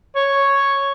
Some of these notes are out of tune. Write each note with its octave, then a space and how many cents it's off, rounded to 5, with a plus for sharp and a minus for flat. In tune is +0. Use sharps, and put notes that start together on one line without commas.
C#5 +0